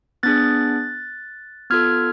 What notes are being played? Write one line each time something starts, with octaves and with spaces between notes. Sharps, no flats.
B3 D4 G#4 F#6 A6
B3 F4 A4 F6 G#6